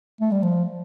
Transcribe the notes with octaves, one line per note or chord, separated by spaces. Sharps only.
A3
G3
F3